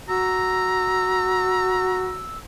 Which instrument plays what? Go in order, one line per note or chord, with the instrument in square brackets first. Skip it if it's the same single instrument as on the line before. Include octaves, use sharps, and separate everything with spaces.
[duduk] F#4 [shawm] A#5 [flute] E6